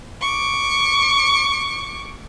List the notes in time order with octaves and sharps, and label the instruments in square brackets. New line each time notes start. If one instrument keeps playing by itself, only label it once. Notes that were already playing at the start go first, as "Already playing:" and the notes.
[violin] C#6 D6